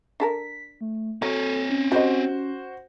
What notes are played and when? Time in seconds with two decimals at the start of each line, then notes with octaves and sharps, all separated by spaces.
0.20 D4 A4 A#4 B6
0.81 A3
1.22 F#3 C4 A4 C#5
1.70 C#4
1.92 G3 F#4 C5 D#5